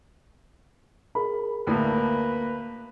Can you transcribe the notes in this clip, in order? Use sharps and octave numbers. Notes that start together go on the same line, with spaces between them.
G#4 A#4 B5
D2 A2 A#3 B4